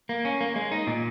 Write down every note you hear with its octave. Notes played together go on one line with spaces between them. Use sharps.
A#3
C#4
A#3
G#3
D#4
A#2